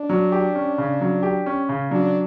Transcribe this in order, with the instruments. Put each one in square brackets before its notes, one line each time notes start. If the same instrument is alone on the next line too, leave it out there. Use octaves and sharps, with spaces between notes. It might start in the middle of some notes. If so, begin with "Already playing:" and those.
Already playing: [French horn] D4
[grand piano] F#3
G4
C#4
C#3
F#3
G4
C#4
C#3
[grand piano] F#3 [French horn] D4